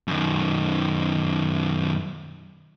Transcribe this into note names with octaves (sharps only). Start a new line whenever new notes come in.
F#2 D#3